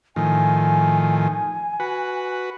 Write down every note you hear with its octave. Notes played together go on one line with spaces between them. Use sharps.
A2 D#3 F3 G#5
F#4 B4